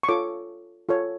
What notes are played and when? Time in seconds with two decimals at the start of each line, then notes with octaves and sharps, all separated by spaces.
0.03 C#6
0.08 F4 A4 C#5 D6
0.89 F4 A4 C#5